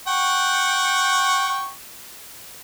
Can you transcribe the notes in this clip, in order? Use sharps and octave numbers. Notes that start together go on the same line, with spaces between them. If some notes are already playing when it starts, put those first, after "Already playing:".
F#5 G5 C#6